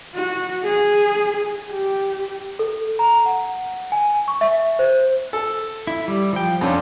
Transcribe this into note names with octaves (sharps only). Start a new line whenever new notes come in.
F#4
G#4
G4
A4
A#5
F#5
G#5
C#6
E5
C5
A4
E4
G3
F3 G5
F2 C#4 D4